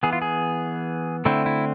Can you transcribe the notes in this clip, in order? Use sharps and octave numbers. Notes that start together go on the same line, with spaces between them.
E3 B3 G#4
F4
G#4
D3 A3 C4 E4
E4